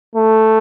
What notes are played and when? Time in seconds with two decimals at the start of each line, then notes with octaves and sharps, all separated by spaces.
0.15 A3